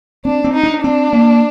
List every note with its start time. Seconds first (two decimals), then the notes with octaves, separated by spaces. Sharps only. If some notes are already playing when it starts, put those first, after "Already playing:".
0.25 C4 D4
0.44 C4
0.54 D#4
0.63 D4
0.83 C4 D4
1.13 A#3